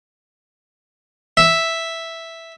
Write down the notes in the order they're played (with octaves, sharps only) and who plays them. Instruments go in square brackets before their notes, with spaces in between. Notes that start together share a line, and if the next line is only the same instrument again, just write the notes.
[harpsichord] E5